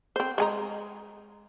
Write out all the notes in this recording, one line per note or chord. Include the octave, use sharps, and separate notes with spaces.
C4 C5
G#3 G#5 A#5